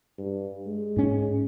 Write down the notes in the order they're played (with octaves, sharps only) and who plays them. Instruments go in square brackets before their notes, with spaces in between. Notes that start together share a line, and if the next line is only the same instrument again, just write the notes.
[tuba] G2
G#3
[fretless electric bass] G#2 C#4